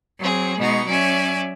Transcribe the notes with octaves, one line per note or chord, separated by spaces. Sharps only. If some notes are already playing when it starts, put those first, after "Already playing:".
F#3 C4 G#4
B2 G#3 B3 D#4 C#6
F#3 C#4 D5 E5 G#5